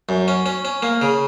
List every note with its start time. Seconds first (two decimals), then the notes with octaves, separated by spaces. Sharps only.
0.09 F#2
0.28 C#4
0.46 C#4
0.65 C#4
0.82 A#3
1.02 C#3